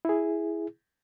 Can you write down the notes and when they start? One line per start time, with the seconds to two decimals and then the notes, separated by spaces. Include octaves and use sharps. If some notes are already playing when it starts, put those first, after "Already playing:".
0.05 E4 G#4